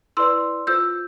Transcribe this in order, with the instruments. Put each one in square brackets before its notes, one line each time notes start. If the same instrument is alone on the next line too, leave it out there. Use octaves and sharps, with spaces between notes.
[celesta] E4 B4 D5 C6 E6
F4 C5 E6 G6